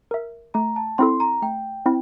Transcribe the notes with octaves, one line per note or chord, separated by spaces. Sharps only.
A#4 E5
A3 A#5
A5
C4 E4 A4 C6
A#5
A3 G5
C4 E4